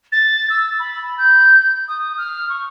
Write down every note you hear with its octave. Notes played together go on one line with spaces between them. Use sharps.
A6
E6
B5
G6
D#6
F6
C#6